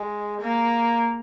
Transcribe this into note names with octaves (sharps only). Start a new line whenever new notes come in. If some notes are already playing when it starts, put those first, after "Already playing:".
Already playing: G#3
A#3